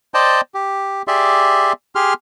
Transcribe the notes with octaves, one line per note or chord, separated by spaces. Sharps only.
C5 D5 D#5 G5 A5
G4
G4 G#4 D5 E5 C6
G4 G#4 C6 F6